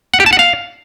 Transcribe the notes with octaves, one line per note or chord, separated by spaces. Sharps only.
F#5
G4
A5
F#5
F5